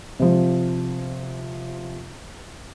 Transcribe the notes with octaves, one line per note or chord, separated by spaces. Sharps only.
C3 F3